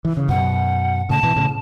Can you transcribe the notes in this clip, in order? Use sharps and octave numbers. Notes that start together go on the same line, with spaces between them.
E3
C#3
F#2 B2 F#5
A2 C#3 A5
B2 E3
A2 C#3